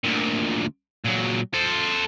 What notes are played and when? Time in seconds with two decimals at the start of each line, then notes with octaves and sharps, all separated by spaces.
0.04 D2 A#2
1.05 A#2 F#3
1.54 A4 C5